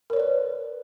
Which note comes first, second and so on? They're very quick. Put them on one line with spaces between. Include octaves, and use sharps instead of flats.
A#4 C#5 D5 B4